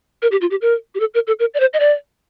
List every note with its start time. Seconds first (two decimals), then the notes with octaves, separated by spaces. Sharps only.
0.22 A#4
0.32 G4
0.41 F4
0.51 G4
0.61 A#4
0.95 G4
1.00 A4
1.14 A#4
1.27 A4
1.39 A#4
1.54 D5
1.60 C5
1.74 D#5
1.80 D5